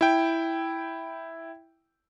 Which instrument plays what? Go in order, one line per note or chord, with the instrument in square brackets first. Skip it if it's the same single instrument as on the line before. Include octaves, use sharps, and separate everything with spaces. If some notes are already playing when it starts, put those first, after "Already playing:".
[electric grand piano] E4 G5